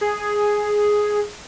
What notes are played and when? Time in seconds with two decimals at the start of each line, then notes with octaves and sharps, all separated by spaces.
0.01 G#4